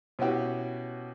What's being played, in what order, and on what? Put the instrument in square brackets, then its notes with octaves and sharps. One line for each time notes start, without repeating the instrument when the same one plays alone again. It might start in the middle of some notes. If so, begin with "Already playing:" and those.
[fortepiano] B2 C#4 E4 F#4 G4